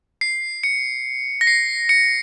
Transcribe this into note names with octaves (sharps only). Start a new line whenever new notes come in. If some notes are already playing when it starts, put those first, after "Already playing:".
C7
C#7
A#6
C7
C#7